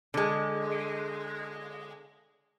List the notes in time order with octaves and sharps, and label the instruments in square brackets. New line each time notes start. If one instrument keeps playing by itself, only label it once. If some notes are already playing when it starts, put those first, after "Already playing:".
[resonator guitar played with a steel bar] D3 G#3